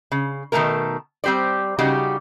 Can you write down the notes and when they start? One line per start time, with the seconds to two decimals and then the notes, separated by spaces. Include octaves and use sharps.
0.12 C#3
0.52 B2 D#3 F#3 A3 A4 A#4
1.24 G3 C4 G4 C5 D5
1.79 C#3 G3 D#4 F#4 G4